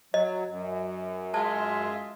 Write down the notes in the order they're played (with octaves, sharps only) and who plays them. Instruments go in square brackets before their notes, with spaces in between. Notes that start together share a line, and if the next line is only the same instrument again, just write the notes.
[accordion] F#3 [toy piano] D#5
[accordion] F#2
[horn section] G#3 F4 E5 [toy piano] A5